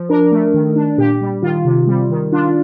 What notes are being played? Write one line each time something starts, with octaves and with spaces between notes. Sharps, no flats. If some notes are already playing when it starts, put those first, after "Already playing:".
Already playing: F3
D4 A#4
A3
D#3
D4
A#2 G4
G3
D#3 F4
C3
G3
D#3
D4 F4